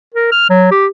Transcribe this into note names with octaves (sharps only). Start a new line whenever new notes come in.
A#4
F6
F#3
G4